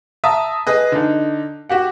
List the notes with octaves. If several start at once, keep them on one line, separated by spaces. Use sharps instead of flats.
E5 A5 A#5 D#6
G#4 B4 D#5
D3 D#4
F#4 G4 F#5